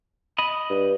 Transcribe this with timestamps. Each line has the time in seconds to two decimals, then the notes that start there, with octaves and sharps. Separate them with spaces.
0.38 D#5 B5
0.70 G2